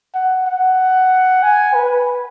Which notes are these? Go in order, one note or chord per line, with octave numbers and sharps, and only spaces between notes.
F#5
F#5
G#5
B4